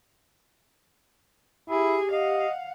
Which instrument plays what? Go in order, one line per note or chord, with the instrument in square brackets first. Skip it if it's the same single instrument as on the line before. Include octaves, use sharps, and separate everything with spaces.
[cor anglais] E4 [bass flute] G4 [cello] G#4
[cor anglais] D#5 [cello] F5 F#5